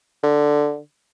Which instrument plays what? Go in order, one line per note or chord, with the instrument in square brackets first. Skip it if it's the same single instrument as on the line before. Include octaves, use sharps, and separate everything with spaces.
[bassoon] D3